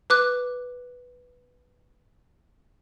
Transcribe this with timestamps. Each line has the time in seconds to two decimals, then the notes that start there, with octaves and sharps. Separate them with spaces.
0.10 B4 D6 F#6